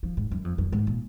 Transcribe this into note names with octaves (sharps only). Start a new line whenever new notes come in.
F3
G#2
F#2
F2
F#2
G#2
A#2